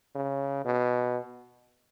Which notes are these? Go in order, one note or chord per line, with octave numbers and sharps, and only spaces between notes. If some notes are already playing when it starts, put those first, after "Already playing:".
C#3
B2